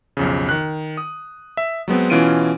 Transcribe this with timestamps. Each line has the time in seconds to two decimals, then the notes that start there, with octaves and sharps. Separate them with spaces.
0.17 B1 F2 C#3
0.49 D#3 F#6
0.97 D#6
1.57 E5
1.88 F#3 G#3 B3 C4
2.10 B2 E3 C#4 F4 D7 D#7